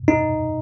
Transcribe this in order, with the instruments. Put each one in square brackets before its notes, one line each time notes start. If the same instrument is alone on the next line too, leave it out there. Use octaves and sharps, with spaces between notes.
[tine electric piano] D#4